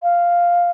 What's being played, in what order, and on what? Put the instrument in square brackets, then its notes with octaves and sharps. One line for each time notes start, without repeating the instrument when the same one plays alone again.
[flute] F5